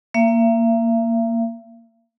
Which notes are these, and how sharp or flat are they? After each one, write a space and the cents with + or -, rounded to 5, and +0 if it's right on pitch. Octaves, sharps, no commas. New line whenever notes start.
A#3 -5 E5 +40